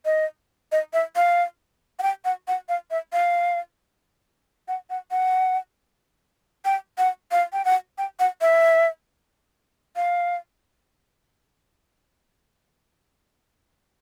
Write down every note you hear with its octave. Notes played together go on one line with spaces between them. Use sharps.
D#5
D#5
E5
F5
F#5
G5
F#5
F#5
F5
E5
F5
F#5
F#5
F#5
G5
F#5
F5
G5
F#5
G5
F#5
E5
F5